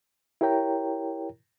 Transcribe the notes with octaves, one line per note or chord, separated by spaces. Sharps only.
E4 G4 A#4 C#5 G5 A#5